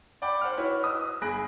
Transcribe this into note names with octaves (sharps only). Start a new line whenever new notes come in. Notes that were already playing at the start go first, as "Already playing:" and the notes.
D5 F#5 G5 B5 D6
C5 F#5 F6
E4 F#4 B4 C#5
D#5 D#6 E6
G1 G#4 B5 F#6 A#6 D7